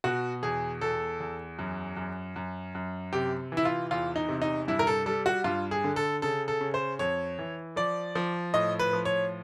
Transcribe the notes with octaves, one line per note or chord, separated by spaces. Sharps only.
B2 F#4
E2 G#4
E2 A4
E2
F#2
F#2
F#2
F#2
C3 G4
E3
E4
F4
E2 F4
D#4
C3
D#4
G2 E4
A#4
A4
G3 A4
F#4
G2 F4
G#4
D3
A4
C#3 A4
A4
C#3
C5
F2 C#5
E3
F3 D5
F3
A2 D#5
B4
F3
C#5